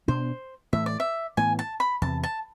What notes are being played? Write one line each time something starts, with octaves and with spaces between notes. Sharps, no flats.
B2 B3 D4 C5
A2 E3 A3 E5
D5
E5
A2 E3 B3 G#5
A5
B5
E2 C3 E3 A5
A5